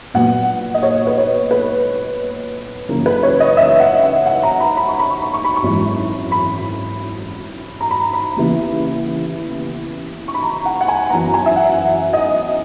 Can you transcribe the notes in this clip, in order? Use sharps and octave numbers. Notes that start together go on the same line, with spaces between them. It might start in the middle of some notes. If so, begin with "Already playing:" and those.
A#1 A#2 F#3 B3 F#5
D#5
C#5
B4
C#5
B4
F#2 C#3 E3 A#3
B4
C#5
D#5
E5
F#5
F#5
F#5
A#5
B5
B5
C#6
B5
C#6
B5
C#6
B5
C#6
G#1 F#2 E3 G#3 B5
B5
A#5
B5
B5
D#2 C#3 E3 B3
C#6
B5
A#5
F#5
F#5
G#5
F#2 E3 B3 A#5
G#5
E5
F#5
D#5